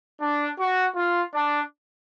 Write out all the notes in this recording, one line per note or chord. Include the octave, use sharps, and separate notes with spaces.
D4
F#4
F4
D4